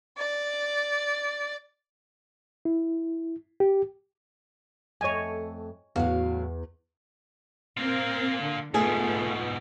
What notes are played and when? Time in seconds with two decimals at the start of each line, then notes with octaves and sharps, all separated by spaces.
0.17 D5
2.65 E4
3.60 G4
5.01 F2 A3 C#5 D#5 G#5
5.96 E2 A2 F#3 F#4 F5
7.77 A#3 C4 F4 A#4
8.42 D3
8.74 G#2 B2 A3 B3 F4 G#4